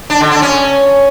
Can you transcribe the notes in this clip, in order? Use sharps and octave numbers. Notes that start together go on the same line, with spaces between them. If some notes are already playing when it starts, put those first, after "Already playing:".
D4
D3
D4
C#4